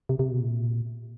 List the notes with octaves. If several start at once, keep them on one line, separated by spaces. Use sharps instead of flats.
C3
C3
B2
A#2